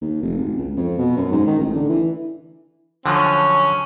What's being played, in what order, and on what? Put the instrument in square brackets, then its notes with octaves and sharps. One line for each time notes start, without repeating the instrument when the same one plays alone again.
[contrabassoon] D#2
F1
G#1
C#2
F2
B2
F#2
G#2
D#3
A1
D3
E3
[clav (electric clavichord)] D3 F3 F#3 [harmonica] C#4